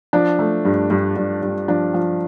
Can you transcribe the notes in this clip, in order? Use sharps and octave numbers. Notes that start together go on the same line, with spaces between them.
F3 D4
A3
G2
G2
G2
G2
F3 D4
F3